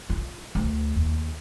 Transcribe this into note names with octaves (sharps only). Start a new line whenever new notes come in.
F4
D2
D#2